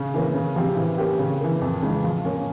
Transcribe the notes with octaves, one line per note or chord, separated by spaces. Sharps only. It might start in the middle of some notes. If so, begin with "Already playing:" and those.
Already playing: C#3
E3 A#3 C#4
C#3
F3 C4 G4
E3
A#3 C#4 G4
C#3
E3 A#3
F2
C#3 E3 G#3
F3
A#3 C#4